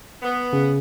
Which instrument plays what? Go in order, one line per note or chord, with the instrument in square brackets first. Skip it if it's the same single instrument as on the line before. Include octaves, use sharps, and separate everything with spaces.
[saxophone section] B3
[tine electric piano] C#3